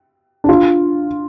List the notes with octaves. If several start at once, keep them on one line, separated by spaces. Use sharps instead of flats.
D4
F4